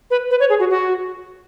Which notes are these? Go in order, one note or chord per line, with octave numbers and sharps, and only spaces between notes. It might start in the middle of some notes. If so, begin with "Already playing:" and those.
B4
B4
C#5
G#4
F#4
F#4